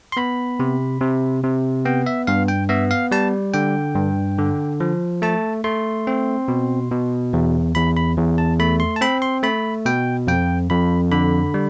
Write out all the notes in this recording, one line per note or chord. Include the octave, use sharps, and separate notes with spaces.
C6
B3 B5
C3
C3
C3
B3 G5
E5
G2 F5
G5
B3 E5
F5
G3 A5
D3 G5
G2
D3
F3
A3 A5
A3 C6
C4
B2
B2
E2
E2 B5
B5
E2
A5
A3 B5
C6
A5
C4 B5
C6
A3 B5
B2 G5
F2 G5
F2 B5
D3 B5
G3